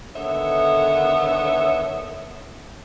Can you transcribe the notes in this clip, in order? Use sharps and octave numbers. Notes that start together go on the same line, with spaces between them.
D3 D#3 B3 C#5 E5